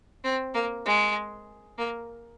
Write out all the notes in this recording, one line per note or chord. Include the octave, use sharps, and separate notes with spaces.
C4
A#3
G#3
A#3